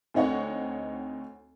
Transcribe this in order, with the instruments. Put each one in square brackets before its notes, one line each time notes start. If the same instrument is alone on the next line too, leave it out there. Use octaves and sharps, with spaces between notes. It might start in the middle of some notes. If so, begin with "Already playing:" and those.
[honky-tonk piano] D2 C4 D#4 C#5 F#5 C#6